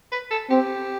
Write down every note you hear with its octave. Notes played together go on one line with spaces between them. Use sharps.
B4
A4
C4 G4